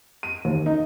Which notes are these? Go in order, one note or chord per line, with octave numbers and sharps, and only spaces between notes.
D#7
D#2
D#4